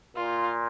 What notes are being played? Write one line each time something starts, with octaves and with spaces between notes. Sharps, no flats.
A#2 F4